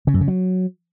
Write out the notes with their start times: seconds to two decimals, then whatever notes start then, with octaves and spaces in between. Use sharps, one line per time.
0.07 C#3
0.14 F#2
0.21 C#3
0.28 F#3